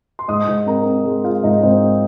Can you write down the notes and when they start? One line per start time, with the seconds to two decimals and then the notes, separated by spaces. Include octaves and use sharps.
0.19 C6
0.28 G#2 D#5 D#6
0.47 G#2
0.66 C4 A#4 A#5
0.85 C4
1.05 G#3
1.24 G#3 F4 F5
1.43 G#2 D#4 D#5
1.57 D#5
1.63 G#2 C4 C5